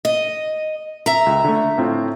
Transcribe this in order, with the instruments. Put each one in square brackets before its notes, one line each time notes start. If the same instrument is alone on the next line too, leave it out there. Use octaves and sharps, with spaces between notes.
[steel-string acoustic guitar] D#5
E5 A#5
[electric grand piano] C#2
D3 A3
A2 C4 F4